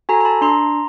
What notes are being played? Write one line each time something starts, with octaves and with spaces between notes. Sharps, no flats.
F#4 A4 G#5 A#5
A#5
A5 B5
D4 A#5 C6